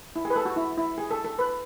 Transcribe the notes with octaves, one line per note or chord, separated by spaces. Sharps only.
E4
G#4
B4
A4
F#4
E4
E4
G#4
A4
A4
B4